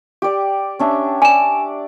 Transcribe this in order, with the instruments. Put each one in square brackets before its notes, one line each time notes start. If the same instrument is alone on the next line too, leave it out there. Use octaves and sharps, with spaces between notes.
[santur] G4 D5
C#4 D4 E5
[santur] D5 [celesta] G#5 E7